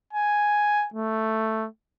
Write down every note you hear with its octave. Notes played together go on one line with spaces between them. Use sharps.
G#5
A3